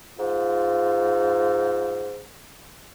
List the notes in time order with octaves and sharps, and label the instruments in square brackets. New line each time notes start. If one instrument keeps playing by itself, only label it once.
[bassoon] G#2 [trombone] F4